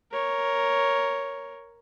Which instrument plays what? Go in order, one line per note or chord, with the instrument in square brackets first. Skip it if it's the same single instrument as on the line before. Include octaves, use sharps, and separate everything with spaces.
[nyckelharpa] A#4 C#5